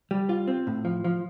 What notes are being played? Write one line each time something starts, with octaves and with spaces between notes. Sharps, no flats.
G3
F4
C4
A2
F3
F3